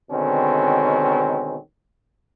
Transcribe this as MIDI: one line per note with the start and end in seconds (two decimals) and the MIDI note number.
0.11 1.57 47
0.11 1.57 50
0.11 1.57 51
0.11 1.57 56
0.11 1.57 60
0.11 1.57 61